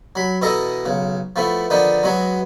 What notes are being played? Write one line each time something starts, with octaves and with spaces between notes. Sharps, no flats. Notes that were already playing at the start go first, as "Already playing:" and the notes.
F#3 B5
B2 E3 E4 A4 D#5 A#5
B1 C#3
F3 A3 B3 E4
D3 D#3 F3 B3 D4 D#4
F#3 G#3 B3 F#4